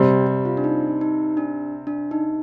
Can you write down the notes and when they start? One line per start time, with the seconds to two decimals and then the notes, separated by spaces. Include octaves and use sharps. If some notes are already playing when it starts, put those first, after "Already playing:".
Already playing: C3 G3 C4
0.09 G4
0.27 G4
0.45 F4
0.57 D4
0.64 D#4
1.01 D#4
1.37 D4
1.87 D4
2.11 D#4